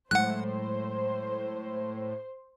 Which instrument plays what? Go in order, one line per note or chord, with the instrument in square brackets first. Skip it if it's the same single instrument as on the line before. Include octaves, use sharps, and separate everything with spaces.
[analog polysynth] A2 [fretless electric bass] F#3 G#3 A3 [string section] C5 [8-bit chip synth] F#5 F#6